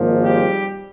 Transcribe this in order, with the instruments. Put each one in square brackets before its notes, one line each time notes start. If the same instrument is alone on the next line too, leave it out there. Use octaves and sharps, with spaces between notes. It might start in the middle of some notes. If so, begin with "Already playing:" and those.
Already playing: [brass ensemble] G#1 G#2 F3 A#3
G3 G4